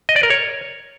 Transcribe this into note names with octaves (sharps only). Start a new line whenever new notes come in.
D#5
D5
A#4
C#5